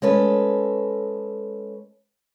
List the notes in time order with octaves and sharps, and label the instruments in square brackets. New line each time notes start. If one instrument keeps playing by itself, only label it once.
[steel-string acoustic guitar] G#3 C#4 A4 B4